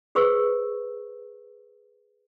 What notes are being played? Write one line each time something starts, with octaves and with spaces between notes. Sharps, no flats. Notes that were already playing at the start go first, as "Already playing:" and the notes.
G#4 B4 C5 C#6 E6